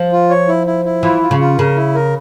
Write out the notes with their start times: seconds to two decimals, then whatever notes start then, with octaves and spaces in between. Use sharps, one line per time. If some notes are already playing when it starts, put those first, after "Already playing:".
Already playing: F3
0.12 F4
0.30 C#5
0.48 E4
0.67 E4
0.85 E4
1.03 E3 F4
1.22 F4
1.31 C#3
1.40 F4
1.58 C#3 A#4
1.76 E4
1.95 A#4